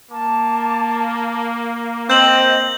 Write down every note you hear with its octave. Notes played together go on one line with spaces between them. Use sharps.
A#3 A5 D6
C4 D#5 G6 F#7